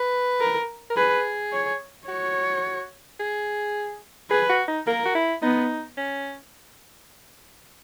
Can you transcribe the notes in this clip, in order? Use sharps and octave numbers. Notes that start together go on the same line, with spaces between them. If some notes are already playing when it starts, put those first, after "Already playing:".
Already playing: B4
A#4
A#4
G#4 B4
C#5
F#4 C#5
G#4
G#4 B4
F#4
D#4
A#3 A#4
F#4
E4
B3 D#4
C#4